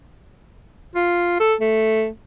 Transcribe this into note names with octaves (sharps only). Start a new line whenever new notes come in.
F4
A4
A3